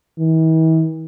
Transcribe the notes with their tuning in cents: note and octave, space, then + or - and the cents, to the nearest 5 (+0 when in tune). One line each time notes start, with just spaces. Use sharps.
E3 -45